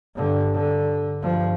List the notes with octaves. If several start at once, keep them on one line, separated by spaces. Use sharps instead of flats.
G2 D3
D3
G2 F3